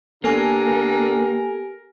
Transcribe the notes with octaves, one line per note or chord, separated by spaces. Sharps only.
D3 A#3 B3 G4 A4 A#4 G#5